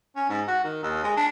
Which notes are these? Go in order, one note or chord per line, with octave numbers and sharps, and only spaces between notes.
C#4
G#2
F#4
D#3
D#2
G#3
D4